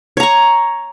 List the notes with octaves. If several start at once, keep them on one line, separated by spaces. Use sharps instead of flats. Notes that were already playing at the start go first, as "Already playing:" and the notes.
C#5 A#5 C#6